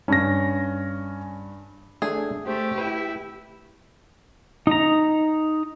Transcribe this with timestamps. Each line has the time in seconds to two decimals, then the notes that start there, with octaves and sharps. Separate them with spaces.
0.08 G2 C#4 A#6
2.02 A3 D4 G#4
2.47 A3 G4 C5
2.78 E4 B4
4.67 D#4 A#5